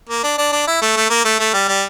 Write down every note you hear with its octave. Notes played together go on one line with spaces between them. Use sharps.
A#3
D4
D4
D4
E4
A3
A3
A#3
A3
A3
G3
G3